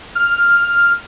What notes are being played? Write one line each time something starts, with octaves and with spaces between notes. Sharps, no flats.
F6